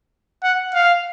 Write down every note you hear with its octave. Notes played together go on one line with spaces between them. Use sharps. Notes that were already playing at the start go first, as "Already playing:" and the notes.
F#5
F5